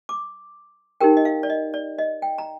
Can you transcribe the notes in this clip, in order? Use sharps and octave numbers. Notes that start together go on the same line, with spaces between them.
D6
D#4 G4 A#4 G5
D#5
F5
D5
D#5
D5
D#5
G5
A#5